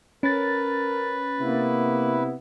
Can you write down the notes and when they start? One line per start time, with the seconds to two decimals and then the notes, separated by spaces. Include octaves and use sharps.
0.23 C#4 A#4 B4 A6
1.39 C3 A#3 B3 E4